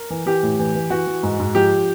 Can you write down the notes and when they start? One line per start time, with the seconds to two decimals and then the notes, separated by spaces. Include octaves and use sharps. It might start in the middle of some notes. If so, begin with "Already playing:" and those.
Already playing: A#4
0.10 E3
0.26 E3 G4
0.43 A2
0.59 E3
0.75 E3
0.90 E3 F#4
1.07 E3
1.23 G#2
1.39 G#2
1.55 F3 G4